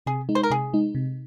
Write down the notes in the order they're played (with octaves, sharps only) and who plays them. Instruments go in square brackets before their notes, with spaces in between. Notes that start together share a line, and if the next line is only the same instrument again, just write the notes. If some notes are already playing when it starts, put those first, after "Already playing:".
[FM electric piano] C3 [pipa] G#4
[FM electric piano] G#3 D#4
[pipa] C5
A#4
[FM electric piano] C3 [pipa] G#4
[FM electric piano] G#3 D#4
C3